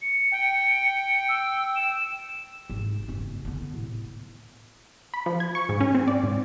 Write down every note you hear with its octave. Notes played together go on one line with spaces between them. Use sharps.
C#7
G5
E6
E7
G#1
F#1 C#4
D3 B3
A2
B5
F3
G#6
C#6
G#2
C#4
C4
D5
G#2